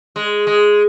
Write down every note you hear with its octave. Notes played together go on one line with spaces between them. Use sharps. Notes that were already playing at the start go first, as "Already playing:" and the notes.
G#3
G#3